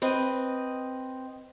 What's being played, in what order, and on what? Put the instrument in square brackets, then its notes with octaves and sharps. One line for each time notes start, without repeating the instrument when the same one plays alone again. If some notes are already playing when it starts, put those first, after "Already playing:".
[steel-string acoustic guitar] C4 B4 D#5